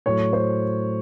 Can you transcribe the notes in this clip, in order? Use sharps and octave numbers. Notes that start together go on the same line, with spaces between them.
A2 F#3 C#5
C5